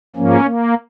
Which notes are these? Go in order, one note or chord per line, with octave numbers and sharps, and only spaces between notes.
G#2 F3 A#3 C#4
A#3